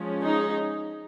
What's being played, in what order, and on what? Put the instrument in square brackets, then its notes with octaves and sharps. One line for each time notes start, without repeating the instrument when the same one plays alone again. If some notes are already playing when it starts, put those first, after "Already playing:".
Already playing: [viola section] F3 G#3 C#4
D#4 G#4